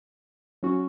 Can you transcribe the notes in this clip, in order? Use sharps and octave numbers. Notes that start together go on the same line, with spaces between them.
F#3 C#4 F#4